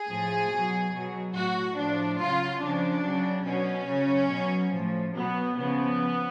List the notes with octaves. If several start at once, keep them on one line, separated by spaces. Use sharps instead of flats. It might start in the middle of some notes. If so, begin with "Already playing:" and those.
Already playing: G#4
A2 F3
B2 F#3
B2 F#3
A2 F#3 F#4
A2 F3 D4
C#3 F#3 F4
C#3 F3 D4
C#3 F#3
B2 F#3 C#4
C#3 F#3
B2 F#3
A2 F3
B2 F#3 B3
C#3 F3 B3